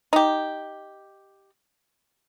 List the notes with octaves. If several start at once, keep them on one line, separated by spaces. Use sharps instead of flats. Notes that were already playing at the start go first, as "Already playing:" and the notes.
D#4 G4